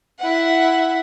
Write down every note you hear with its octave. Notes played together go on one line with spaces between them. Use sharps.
E4 F#5